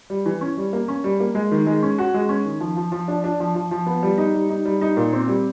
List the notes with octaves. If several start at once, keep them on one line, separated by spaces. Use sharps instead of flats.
G3
E3
C#4
G3
A#3
C#4
G3
A#3
G#3
D#3
G#3
C#4
F#4
G#3
C#4
D#3
F3
F3
F3
D4
D4
F3
F3
F3
B3
G3
D#4
G3
D#4
G3
D#4
A#2
C4
G3